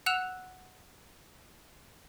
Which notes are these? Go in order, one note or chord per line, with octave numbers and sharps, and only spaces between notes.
F#5 E6 F#6 E7 F7